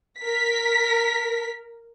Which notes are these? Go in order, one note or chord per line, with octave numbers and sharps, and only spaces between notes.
A#4 B6